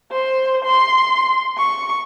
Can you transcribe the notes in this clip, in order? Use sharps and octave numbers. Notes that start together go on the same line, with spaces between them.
C5
C6
C#6